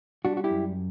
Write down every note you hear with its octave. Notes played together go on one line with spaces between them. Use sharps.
G3 D4 F#4
F#4
E4 G4
F#2